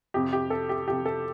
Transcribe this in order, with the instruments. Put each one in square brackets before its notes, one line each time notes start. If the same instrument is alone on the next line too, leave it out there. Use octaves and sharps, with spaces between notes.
[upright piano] F2 C3 G4
G4
A4
G4
F2 C3 G4
A4